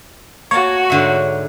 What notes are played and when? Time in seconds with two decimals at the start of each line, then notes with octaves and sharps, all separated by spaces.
0.51 A#3 F#4 C#5 A5
0.90 G#2 D3 E5